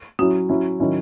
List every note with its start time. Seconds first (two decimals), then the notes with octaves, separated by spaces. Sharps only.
0.19 F#3 C#4 E4 F#4
0.49 F#3 C#4 E4
0.80 D#3 F#3 C#4 E4